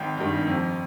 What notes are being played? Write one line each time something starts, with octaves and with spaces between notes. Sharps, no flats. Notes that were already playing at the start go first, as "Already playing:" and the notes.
Already playing: G#1 G5
G2 D#3
F2